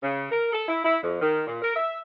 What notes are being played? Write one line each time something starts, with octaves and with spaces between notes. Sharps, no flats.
C#3
A#4
A4
E4
E4
F2
D#3
A#2
A#4
E5